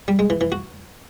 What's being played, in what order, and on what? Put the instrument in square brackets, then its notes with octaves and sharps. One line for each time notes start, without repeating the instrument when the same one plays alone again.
[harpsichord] G3
G#3
E3
E3
F#4